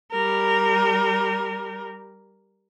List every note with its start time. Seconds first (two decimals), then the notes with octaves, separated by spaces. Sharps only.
0.12 G3 A#4